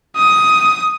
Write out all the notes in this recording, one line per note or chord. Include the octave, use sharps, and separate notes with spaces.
D#6